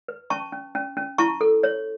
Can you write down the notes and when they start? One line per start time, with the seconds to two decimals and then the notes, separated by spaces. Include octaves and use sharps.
0.08 B4
0.30 C#4 A5 C#6
0.53 C#4
0.75 C#4
0.97 C#4
1.18 E4 A5 C#6
1.41 A4
1.63 C#5